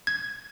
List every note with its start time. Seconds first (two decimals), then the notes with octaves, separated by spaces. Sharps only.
0.07 G#6